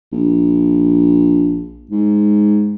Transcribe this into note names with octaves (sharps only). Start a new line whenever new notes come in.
A#1
G#2